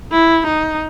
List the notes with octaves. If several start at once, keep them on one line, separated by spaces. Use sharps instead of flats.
E4
D#4